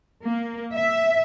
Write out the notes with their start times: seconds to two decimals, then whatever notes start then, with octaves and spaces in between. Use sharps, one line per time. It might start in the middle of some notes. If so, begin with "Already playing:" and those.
0.24 A#3
0.73 E5